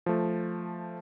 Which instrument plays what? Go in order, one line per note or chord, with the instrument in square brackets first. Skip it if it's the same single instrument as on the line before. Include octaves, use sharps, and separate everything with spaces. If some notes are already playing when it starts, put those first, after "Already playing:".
[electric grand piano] F3 A3